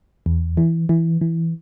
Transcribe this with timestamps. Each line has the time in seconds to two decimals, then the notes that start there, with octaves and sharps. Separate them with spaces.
0.26 E2
0.57 E3
0.89 E3
1.21 E3